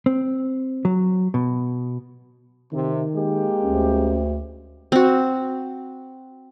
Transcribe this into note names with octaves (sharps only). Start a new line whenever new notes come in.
C4
F#3
B2
C3 D#3
G#3 A#3 G4
D2 C#4
C4 F#4